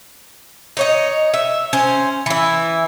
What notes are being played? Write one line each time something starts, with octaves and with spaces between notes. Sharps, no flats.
D#4 C#5 D#5
E5
C#4 C5
E3 E4